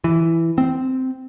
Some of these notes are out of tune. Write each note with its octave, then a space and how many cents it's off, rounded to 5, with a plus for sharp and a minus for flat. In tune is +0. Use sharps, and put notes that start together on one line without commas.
E3 +5
C4 -10